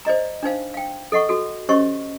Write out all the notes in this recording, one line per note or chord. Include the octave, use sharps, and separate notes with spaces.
C5 D5 D#5 A#5
D4 D#4 C5 F5
F5 G5
A4 D#5 F#5 C#6
F#4 A4
C#4 G4 C5 C#5 D#5 C#6